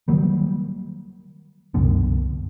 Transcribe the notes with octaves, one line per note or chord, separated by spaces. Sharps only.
D#3 F#3 G3 A#3
C2 F#2 B2 D3